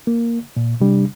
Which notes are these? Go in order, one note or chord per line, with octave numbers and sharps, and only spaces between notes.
A#3
A#2
C3 G3 D4